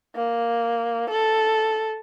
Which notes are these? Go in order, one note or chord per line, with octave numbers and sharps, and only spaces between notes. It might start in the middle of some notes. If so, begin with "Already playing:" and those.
A#3
A4